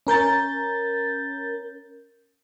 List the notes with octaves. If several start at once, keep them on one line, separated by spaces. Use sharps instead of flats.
C#4 A#4 G6 A6